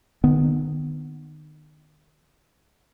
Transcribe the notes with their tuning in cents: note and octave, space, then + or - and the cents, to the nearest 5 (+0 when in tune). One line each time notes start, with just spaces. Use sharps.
D#3 -35 B3 +0